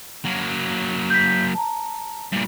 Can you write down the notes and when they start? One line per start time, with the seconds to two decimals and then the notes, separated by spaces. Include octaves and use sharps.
0.25 F#3 A#3
1.10 G6 B6
1.55 A5 A#5
2.32 G2 A#2